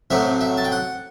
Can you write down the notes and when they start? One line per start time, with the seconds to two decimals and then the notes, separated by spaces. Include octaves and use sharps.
0.10 A1 A2 F#3 C4 E5
0.41 E5
0.57 A5
0.64 G5
0.72 F#5